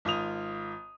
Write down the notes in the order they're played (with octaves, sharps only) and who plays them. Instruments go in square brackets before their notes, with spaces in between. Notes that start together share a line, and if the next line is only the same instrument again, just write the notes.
[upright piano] G#1 F4 D#6 F7